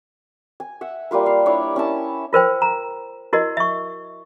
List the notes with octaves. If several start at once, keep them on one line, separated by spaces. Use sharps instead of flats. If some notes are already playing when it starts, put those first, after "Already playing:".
G#5
E5 F#5
G3 A#3 F4 B4
F5
D4 E4 C#5 D5
C#4 E4 A5
F4 A#4 C5 G5
A#5
E4 F#4 A#4 D#5
E5 C#6